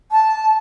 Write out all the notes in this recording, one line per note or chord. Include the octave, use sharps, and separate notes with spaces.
A5